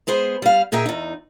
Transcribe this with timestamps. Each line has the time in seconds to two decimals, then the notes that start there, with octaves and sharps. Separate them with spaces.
0.07 G#3 B3 G#4 C5
0.42 G3 F5
0.72 A#2 D#4 G#4 E5 G5
0.86 E2 D#4